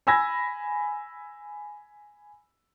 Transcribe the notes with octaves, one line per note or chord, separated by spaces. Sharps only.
G#5 B5 E6 G#6 A#6